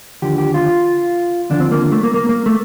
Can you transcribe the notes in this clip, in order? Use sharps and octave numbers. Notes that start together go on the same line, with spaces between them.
D#2 D3 F3 G4
G4
F4
D#2 D3 F3 D4
C4
A#3
A3
A#3
A#3
A#3
A3